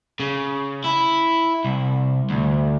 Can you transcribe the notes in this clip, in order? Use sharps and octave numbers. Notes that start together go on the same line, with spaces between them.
C#3
E4
C2
D2